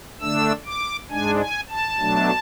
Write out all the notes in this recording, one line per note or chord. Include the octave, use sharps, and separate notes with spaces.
D3 A3 D4 E6
D6
G#2 G#3 D4 G#5
G#5
A5
B2 F#3 A3 D4